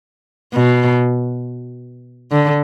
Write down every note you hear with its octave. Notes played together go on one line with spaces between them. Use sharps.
B2
D3